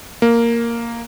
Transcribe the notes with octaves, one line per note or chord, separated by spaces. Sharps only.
A#3